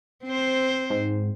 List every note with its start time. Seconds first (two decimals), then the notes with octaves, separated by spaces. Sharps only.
0.25 C4 C5
0.90 G#2